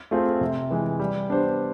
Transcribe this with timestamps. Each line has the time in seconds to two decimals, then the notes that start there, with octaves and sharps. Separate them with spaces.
0.11 A3 C4 F4 G#4
0.41 C3
0.71 E3 G#3
0.99 G3
1.29 B3 D4 G4 C5